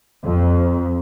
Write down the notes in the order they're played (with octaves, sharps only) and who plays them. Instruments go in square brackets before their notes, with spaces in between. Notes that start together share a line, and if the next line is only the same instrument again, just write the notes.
[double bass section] F2